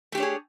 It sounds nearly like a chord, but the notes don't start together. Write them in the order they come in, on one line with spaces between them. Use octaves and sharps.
A3 G4 D4 C#5 G#4